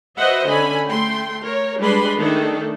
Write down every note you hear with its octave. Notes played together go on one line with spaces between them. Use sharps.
F#4 B4 C5 D#5 E5 F#5
D3 C#4 G#5 B5
A3 G5 C6
A#4 C#5
G3 G#3 D4 B4 B5 C6
D#3 A3 D4 G#4 A4